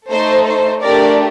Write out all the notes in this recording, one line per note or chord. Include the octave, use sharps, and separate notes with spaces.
A3 D#4 A4 C5
C5
A3 D4 G4 A#4 D5